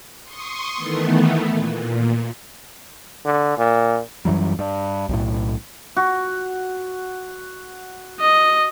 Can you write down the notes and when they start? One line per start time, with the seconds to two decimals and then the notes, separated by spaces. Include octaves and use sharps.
0.24 C6 C#6 D#6
0.76 D#3 E3 A3 B3
1.49 A#2
3.25 D3
3.58 A#2
4.25 F#2 E3 F#3 G3
4.59 G2
5.09 B1 A2
5.97 F#4
8.21 D#5